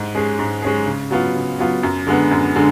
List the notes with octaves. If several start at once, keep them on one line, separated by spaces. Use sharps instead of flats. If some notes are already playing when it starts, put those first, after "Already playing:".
Already playing: G#2
G#3 C#4 G#4
G#2
G#3 C#4 G#4
C#3
F#3 B3 F4
C#3
F#3 B3 F4
F#2
D3 G#3 B3
F#2
D3 G#3